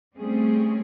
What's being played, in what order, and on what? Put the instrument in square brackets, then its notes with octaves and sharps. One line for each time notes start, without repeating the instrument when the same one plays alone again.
[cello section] G3 A3 C4 C#4 G#4